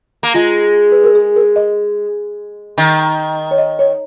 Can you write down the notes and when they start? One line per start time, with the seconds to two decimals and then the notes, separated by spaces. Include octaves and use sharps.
0.23 A#3
0.34 G#3 F4
0.92 B4
1.04 A#4
1.15 G#4
1.36 A#4
1.56 D#5
2.78 D#3
3.51 C#5
3.58 D#5
3.79 C#5